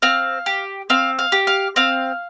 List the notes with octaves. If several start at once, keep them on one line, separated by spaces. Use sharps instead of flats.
C4 F5
G4
C4 F5
F5
G4
F5
C4 F5